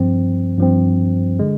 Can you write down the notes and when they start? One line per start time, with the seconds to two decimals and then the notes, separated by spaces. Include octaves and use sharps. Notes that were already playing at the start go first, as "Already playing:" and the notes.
Already playing: G2 F3 C4
0.58 G2 F3 C4
1.39 D3 G#3